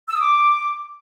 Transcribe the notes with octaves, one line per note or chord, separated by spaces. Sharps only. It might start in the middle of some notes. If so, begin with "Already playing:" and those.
E6
D#6
D6